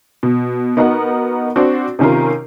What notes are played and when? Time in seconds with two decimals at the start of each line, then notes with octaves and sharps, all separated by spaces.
0.23 B2
0.77 B3 D#4 F#4 A#4 F#5
1.56 C4 D4 F#4
1.99 C3 D#3 C#4 F4 A#4